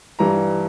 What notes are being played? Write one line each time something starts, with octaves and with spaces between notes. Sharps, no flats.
G2 E3 G3 A#5